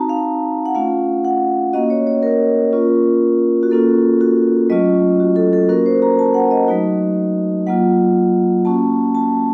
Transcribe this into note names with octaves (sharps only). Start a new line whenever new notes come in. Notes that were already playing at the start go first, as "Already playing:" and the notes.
Already playing: C4 D#4 F#4 A5 A#5
F5
F#5
A3 C#4 F4 F5
F#5
A#3 C#4 F#4 D#5
C#5
C#5
A#4
A#3 C#4 F4
F#4
A#3 C#4 F4 A4
F#4
F#3 A3 C#4 F4 D#5
F#4
A4
A4
A#3 C#4 F#4 A#4
C5
A#5
A5
F#5
D#5
F#3 A3 D#4 F#4
F#3 A#3 F4 F#5
A#3 C#4 F#4 A5
A5